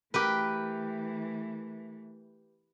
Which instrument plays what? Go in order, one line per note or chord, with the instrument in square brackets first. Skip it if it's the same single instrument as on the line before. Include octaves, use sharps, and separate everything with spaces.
[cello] E3 A3 [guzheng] G4 A#4 B4